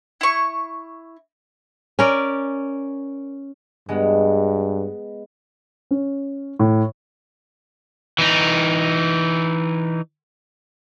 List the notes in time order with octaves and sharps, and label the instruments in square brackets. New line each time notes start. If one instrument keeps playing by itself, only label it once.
[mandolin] E4 C#6
[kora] C#4 A#4 D5
[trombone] G2 [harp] G#3 B3
[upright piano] C#4
A2
[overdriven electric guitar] E3 D#4